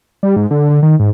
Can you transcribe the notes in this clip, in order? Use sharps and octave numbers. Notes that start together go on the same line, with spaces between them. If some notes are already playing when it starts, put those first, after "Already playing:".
G3
G#2
D3
D3
D#3
G#2